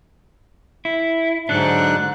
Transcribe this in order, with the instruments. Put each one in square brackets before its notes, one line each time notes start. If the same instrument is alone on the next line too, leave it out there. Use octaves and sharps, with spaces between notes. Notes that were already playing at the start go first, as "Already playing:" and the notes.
[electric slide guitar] E4
[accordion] G#2 [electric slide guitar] D3 F#3 D4 [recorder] F#6